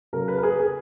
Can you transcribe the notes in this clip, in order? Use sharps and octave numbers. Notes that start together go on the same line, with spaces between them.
C#3 F#3 A#4
B4
A#4
G#4
G#4